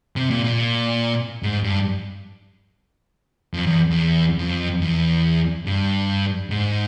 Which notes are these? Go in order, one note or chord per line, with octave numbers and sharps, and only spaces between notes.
C3
A#2
A#2
G#2
G2
F2
E2
E2
F2
E2
G2
G#2